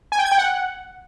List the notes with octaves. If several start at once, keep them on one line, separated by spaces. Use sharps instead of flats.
G#5
G5
G#6
G5
F#5